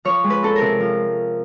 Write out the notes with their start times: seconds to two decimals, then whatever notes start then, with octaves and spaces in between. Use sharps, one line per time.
0.05 F3 C#5
0.24 G#3
0.30 B4
0.43 C4 A4
0.56 A#4
0.61 C3
0.80 F3